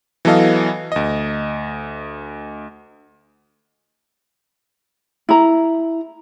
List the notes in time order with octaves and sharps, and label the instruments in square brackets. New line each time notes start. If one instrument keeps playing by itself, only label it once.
[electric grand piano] E3 F#3 B3 A4 D#5 F5
D2 D#5
[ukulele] E4 A#5